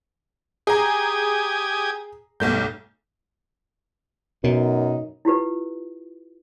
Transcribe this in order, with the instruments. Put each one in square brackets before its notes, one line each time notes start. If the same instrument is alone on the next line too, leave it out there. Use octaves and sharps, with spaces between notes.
[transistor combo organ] G4 G#5 D#6 [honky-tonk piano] G#4 A#5
[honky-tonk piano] B1 A3 G6 [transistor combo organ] G2
[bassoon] F#2 [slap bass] B2 [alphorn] D#4
[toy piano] E4 F4 G4 B4